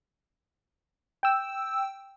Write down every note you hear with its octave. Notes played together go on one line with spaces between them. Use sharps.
G5 E6